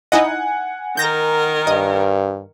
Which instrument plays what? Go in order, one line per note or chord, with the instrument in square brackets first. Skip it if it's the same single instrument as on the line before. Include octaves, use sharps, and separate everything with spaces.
[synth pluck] D#4 E4 D#5 [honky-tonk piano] F#5 G#5
[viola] D#3 A#4 [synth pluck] G6 A#6
[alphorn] G2 [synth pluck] D#5